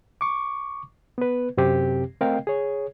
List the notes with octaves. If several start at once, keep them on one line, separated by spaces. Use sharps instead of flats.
C#6 D6
B3 B4
F#2 C3 C4 G4
A3 C4 A#4 D#5 F5 G5
G#4 C#5